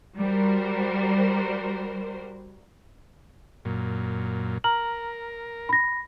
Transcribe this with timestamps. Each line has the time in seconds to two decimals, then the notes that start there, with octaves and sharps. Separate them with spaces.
0.18 G3 F#4 A#4 C5
3.65 F#2 A#2
4.64 A#4 A#5 F6 F#7
5.69 B5 A#6